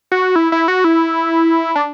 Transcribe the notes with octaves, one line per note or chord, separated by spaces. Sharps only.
F#4
E4
E4
F#4
E4
D4